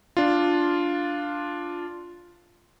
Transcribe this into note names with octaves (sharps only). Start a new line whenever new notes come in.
D4 F4